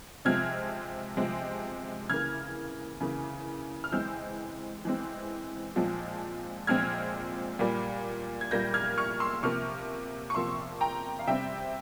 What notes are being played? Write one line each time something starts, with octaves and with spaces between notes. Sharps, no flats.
C3 F3 G#3 C4 F6 G#6
C3 F3 G#3 C4
C#3 E3 A#3 F6 G#6
C#3 E3 A#3
F6
E3 G#3 C4 E6 G6
E3 G#3 C4
A#2 F3 G#3 C4
A#2 F3 G#3 C4 F6 G#6
A#2 G3 A#3
G#6
A#2 G3 A#3 G6 A#6
F6 G#6
C#6 F6
C6 E6
C3 F3 A#3 C#6 F6
C#6
C3 F3 A#3 C6 E6
G5 A#5
F5
C3 G3 C4 E5 G5